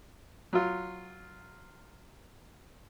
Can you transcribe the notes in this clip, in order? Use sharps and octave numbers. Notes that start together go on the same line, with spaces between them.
F#3 F4